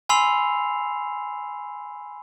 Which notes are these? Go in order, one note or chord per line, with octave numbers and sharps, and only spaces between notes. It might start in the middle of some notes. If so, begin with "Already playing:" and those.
G#5 B5 C6 E6 C7 F7